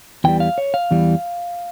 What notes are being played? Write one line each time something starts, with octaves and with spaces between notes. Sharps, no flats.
E2 E3 G3 G5
F5
C#5
F5
E2 E3 G3